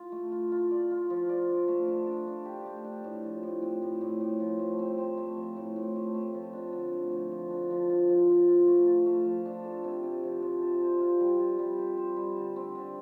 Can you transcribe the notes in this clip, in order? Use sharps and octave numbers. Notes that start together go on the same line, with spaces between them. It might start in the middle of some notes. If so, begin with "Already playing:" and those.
Already playing: F4
A3
F4
F4
D5
F4
F3
D5
D4
A3
D4
D4
D4
G4
A3
D4
A2
F3
A2
C4
A2
A2
A2
F3
A3
C4
C4
A3
F3
A2
A2
A3
A3
F3
D4
D3
A3
F3
F3
D4
F3
F4
F3
F4
F4
A3
F4
A3
F3
D4
A4
C3
C3
F3
F3
A4
C5
F4
G3
F4
G3
C5
C5
G3
D3
C4
D3